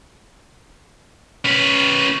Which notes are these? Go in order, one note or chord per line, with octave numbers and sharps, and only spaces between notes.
C#4 B4